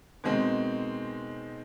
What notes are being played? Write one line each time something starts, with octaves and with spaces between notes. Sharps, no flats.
B2 D#3 G#3 C4